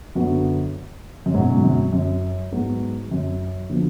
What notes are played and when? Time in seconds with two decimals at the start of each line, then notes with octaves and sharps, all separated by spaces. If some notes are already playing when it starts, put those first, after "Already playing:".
0.15 F#2 D3 F#3 B3 F#4
1.26 F#2
1.34 G#2 B2 F#3 C#4
1.55 G#2
1.63 F#2
1.93 F#2
2.52 G#2 F#3 B3
3.11 F#2
3.70 D3 F3 B3 F#4